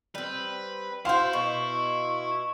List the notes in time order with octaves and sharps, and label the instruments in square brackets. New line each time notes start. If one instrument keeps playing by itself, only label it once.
[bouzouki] G3 C4 [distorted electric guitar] B4
[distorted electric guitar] E4 [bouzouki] F#4 C5 [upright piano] F5 C6
[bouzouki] B2 [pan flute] C#6